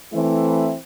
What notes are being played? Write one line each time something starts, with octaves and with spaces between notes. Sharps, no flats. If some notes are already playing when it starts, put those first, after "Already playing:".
E3 A3 C4 E4